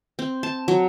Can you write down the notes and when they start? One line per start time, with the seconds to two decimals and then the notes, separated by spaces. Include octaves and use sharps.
0.19 C4
0.43 A5
0.68 F#3